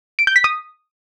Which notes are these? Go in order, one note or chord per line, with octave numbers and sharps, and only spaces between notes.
D7
G6
B6
D#6